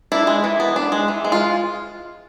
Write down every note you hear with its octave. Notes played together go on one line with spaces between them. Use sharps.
D4 E4
G#3
E3
B3
D4
G#3
E3
G#3
F4